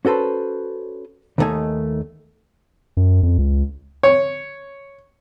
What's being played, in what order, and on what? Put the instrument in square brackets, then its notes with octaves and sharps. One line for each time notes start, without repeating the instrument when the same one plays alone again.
[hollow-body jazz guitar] C#4 F#4 A4 B4 C5
D#2 D#3 E3 A3 D#4 G#5
[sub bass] F#2
F2
C#2
[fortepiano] C#5